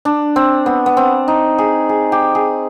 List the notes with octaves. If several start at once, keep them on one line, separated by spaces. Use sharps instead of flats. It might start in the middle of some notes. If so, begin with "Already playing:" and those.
D4
C4
B3
B3
C4
D#4
G#4
G#4
G4
G#4